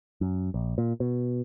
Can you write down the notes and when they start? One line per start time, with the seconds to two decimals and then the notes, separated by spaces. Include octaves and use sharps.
0.21 F#2
0.54 A#1
0.78 A#2
1.00 B2